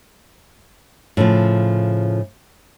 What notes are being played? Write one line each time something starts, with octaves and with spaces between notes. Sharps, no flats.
A2 C#3 F3